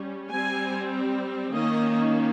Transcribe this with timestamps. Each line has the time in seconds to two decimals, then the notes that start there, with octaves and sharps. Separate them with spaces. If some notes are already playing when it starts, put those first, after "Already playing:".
Already playing: G3 C#4
0.31 G3 C4 G#5
1.53 D#3 A#3 C#4 D#5